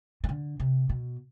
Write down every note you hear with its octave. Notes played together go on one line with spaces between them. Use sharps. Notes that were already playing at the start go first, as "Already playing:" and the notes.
E3
D3
C3
B2